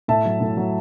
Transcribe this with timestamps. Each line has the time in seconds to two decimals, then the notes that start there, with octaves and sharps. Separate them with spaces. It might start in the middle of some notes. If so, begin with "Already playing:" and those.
0.08 A2 E5 A5
0.25 F#3
0.41 A2
0.57 F#3